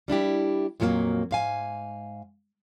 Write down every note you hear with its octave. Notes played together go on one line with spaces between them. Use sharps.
G3 D4 E4 G4
F2 A#2 F#3 A3 A#3
G#2 F5 G#5